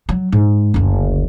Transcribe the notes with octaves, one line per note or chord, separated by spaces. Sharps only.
F#3
G#2
F#1 D2